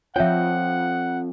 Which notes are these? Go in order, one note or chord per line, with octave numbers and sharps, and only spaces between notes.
F2 F3 F4 C#5 E5 F#5 G5